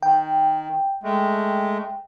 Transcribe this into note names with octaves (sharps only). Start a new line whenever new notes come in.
D#3 G5
G#3 A3